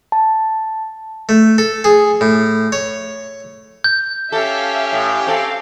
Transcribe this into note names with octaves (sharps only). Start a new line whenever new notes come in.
A5
A3
A4
G#4
A2
C#5
G6
C#4 G4 A4 E5 F5 F6
A2
C4 A4 F5